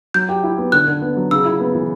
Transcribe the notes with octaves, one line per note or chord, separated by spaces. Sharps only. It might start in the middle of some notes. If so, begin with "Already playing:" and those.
F#3 G6
G4
E4
B3
D3 F#6
D3
B3
F#3
C#3 E6
E4
B3
E3